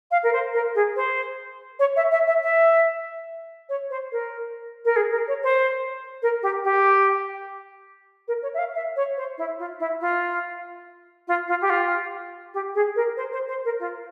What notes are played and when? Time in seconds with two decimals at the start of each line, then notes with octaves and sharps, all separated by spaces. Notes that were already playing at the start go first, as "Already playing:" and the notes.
0.11 F5
0.23 A#4
0.32 C5
0.53 A#4
0.75 G#4
0.96 C5
1.79 C#5
1.96 E5
2.11 E5
2.26 E5
2.42 E5
3.69 C#5
3.90 C5
4.11 A#4
4.84 A#4
4.96 G#4
5.10 A#4
5.27 C#5
5.43 C5
6.22 A#4
6.42 G4
6.64 G4
8.27 A#4
8.42 C#5
8.54 E5
8.58 F5
8.74 E5
8.96 C#5
9.16 C5
9.37 E4
9.58 F4
9.79 E4
10.00 F4
11.27 F4
11.48 F4
11.61 G4
11.69 F4
12.53 G4
12.74 G#4
12.95 A#4
13.16 C5
13.32 C5
13.48 C5
13.64 A#4
13.79 F4